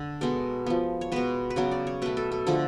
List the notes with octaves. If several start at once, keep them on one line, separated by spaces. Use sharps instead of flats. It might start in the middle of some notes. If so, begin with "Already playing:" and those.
Already playing: D3
B2 G#3 B3 A4
F3 B3
C#5
B2 G#3 B3 B4
B4
C#3 F#3 B3 C#5
D5
C#5
B2 A3 B4
A4
A4
D3 F3 A3 G#4